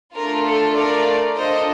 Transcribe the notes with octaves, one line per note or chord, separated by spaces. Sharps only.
A3 D4 F4 A#4
A4
A#4 D5
D4 F4 A4 C5 D#5